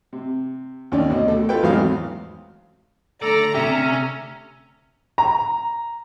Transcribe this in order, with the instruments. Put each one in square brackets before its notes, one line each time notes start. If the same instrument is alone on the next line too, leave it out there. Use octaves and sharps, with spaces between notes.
[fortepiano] C3
D#2 C#4 D5
D2 B2 D#5
A3
F4 A4 B4 G5
G#1 E2 F#3 C4 F5 D#6
[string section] D3 A3 A#5 [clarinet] A4 [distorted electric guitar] D5
[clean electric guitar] C3 G4 [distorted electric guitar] C#4 [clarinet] E5
[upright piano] A#5